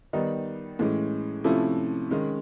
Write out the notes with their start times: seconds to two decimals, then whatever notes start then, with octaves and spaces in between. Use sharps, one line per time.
0.13 D#3 G3 B3 D#4
0.79 A2 E3 G#3 C#4
1.44 C3 F3 A3 C#4 E4
2.10 D#3 G#3 C#4